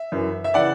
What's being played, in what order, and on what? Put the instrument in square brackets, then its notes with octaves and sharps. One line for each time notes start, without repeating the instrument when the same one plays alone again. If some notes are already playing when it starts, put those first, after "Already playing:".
Already playing: [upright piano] E5
F#2 E3
E5
C#3 E3 D5 F#5